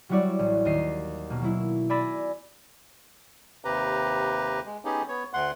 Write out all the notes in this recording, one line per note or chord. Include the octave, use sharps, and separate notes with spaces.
F#3 G3 E4 F#4 C#5 D5
A1
D#2 D#5 C7
B2 A#3
F#3 E4
D5 G#5 B5 E6 A6 A#6
D#2 C3 G4 B4 A#5
G#3
B3 C#4 D#4 G4 G#4
B3 C#5
D2 F#5 C6